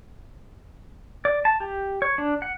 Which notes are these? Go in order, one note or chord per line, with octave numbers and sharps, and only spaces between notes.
D5
A5
G4
C#5
D4
F#5